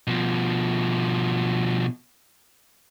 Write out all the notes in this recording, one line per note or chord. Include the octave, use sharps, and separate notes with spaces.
B2 F3